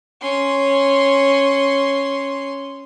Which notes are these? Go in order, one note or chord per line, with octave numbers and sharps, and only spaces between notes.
C#4 C6